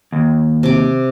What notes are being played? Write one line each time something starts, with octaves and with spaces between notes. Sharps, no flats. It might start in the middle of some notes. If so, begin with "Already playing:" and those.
D#2
C3 D6